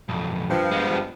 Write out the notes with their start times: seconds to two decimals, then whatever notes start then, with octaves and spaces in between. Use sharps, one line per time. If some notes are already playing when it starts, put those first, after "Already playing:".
0.09 B1 F2
0.50 G2 F3
0.71 G#3 B3